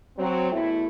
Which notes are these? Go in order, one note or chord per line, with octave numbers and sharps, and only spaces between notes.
F#3 C4
E2 B2 A3 E4